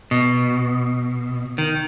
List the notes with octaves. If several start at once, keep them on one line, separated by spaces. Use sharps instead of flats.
B2
D#3